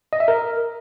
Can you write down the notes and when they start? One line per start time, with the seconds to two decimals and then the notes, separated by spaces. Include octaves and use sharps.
0.13 D#5
0.20 E5
0.28 A#4